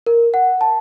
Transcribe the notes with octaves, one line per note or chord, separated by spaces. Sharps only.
A#4
F#5
A5